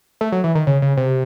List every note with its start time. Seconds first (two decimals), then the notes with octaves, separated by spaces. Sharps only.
0.21 A3
0.32 F#3
0.44 E3
0.55 D#3
0.67 C#3
0.82 C#3
0.97 C3